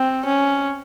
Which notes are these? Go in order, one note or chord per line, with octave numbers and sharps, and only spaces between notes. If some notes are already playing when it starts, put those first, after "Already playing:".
Already playing: C4
C#4